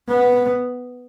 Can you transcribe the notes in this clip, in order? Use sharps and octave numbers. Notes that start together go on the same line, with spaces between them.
B3